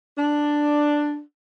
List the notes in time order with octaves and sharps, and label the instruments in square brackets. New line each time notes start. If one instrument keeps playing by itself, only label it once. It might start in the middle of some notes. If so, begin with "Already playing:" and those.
[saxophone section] D4